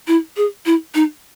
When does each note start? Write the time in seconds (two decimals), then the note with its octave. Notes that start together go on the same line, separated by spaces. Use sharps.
0.07 E4
0.37 G#4
0.66 E4
0.95 D#4